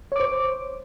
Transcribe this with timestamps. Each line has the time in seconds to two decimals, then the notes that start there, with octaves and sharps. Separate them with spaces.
0.12 C#5
0.16 D6
0.20 C5